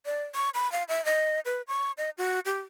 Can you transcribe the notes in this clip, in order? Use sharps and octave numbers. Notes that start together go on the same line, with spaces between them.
D5
C#6
B5
F5
E5
D#5
B4
C#6
D#5
F#4
G4